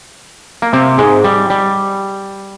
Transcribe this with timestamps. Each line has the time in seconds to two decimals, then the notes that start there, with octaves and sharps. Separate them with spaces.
0.62 A#3
0.73 C3 C4
0.98 G#2 G#3
1.24 G3
1.50 G3